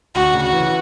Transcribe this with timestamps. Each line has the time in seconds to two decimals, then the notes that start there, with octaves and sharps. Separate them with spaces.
0.15 D2 F#4
0.34 C#3
0.43 F#4
0.53 E3